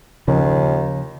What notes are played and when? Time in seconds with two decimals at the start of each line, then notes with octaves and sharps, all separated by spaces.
0.28 D#2 C#3 F3